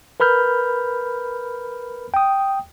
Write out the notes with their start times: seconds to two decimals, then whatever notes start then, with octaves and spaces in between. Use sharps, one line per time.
0.20 A#4 B4 B5 F6 G6
2.14 G5 D#6